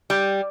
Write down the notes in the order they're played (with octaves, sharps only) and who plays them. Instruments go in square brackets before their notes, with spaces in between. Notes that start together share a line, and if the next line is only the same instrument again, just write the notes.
[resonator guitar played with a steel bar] G3